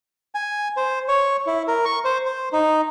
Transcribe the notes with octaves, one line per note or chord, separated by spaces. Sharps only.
G#5
C5
C#5
E4
A#4
C#6
C5
C5
D#4